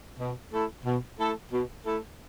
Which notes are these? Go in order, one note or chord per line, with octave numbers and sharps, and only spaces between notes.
B2
A3 E4 A4
B2
A3 E4 A4
B2
A3 E4 A4